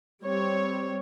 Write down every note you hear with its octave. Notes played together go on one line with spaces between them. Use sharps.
G3 C4 C#5